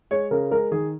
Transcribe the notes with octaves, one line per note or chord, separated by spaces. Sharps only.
G#3 C#5
C#3 A#4
G#3 A#4
D#3 G#4